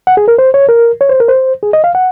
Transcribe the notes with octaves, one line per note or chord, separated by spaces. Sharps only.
F#5
G#4
A#4
C5
C#5
A#4
C#5
C5
A#4
C5
G#4
D#5
F5
F#5